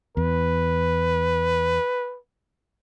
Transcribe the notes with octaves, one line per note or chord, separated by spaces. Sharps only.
E2 B4